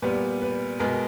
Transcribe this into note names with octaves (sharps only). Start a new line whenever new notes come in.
A#2 G3 B3 B4
B4
B2 G#3 B3 A#4